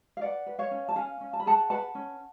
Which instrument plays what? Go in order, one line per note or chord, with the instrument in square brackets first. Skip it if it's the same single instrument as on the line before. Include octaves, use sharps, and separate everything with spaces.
[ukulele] F5
B4 D5 F#5
B4
C#5 F5
C#4
A5
C#4 F5 G#5
C#4
A5
B5
G#4 F#5 A5
B4 F#5 A5
C#4